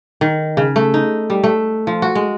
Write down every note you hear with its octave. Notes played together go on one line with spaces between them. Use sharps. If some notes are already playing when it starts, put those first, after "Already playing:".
D#3
C#3
A3
D#4
G3
A3
F3
F#4
G#3